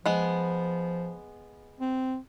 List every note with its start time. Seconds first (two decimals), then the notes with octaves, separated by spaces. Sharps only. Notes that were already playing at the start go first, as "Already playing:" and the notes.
0.06 F3 G#3 B3
1.80 C4